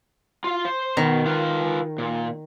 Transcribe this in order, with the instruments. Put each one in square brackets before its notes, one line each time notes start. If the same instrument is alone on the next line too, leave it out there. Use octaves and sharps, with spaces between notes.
[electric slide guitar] F4 F5
C5
[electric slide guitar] B2 [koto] D#3
[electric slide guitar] F4 B4 F5
A#2